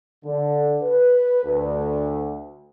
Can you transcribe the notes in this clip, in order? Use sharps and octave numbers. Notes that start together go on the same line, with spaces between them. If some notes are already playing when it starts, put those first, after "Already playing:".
D3
B4
D2